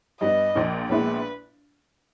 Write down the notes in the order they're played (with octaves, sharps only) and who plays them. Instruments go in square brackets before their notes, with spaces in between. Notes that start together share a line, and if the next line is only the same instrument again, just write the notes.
[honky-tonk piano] G2 G3 B3 [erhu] D#5
[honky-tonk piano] A#1 A#2 A#3
[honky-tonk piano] A#1 A#2 G#3 B3 E4 [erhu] B4